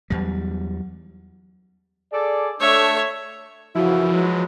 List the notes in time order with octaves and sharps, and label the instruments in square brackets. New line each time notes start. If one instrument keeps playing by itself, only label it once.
[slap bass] E2 G3 [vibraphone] F#3
[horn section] G#4 A4 D5
[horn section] A3 D4 [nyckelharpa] C#5 E5
[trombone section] F#2 C#3 E3 [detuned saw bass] F3 [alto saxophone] E4 [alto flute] F#4
[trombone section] F#3 G#3 B4